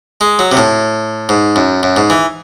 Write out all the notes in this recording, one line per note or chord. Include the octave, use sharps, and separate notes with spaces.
G#3
F#3
C3
A2
G#2
F#2
F#2
G#2
E3